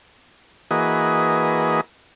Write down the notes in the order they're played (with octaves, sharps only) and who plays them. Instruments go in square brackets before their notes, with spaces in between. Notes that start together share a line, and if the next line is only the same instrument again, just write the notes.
[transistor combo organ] E3 A#3 F#4 G#4 B4 D#5